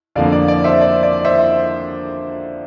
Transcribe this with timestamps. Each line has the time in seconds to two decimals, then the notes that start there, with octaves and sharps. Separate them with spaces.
0.15 F2 D3 F3 A#3 D5 F5
0.32 D5
0.48 D5
0.64 C5 E5
0.81 D5
1.03 D5
1.25 C5 E5